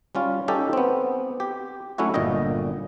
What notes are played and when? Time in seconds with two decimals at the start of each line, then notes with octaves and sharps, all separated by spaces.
0.15 G3 C#4 F4
0.48 C#4 D#4 G4 A4
0.73 B3 C4
1.40 G4
1.98 F#3 A3 C#4 E4 F#4
2.14 G1 A#2 D3 D#5 G5